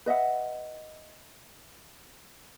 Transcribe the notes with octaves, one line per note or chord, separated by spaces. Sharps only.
B4 D#5 E5 F#5